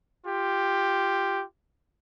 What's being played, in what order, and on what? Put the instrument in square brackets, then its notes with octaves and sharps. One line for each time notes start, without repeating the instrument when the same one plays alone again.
[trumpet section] F4 G4